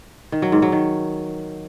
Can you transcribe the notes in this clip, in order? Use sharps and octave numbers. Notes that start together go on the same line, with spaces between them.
D#3
F#3
G#2
F#3
D#3